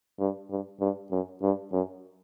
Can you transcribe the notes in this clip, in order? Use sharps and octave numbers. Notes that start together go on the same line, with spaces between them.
G2
G2
G2
F#2
G2
F#2